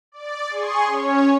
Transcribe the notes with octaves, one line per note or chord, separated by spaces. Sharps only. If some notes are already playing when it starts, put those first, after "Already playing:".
D5
G#4 C6 C#6
C#4 C#5